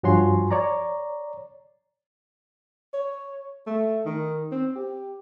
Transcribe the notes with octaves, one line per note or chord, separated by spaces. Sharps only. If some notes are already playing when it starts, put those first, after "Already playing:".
G2 F3 F#4 C#5 G#5 C6
C#5 D5 A#5
C#5
A3
D#3
C4
G4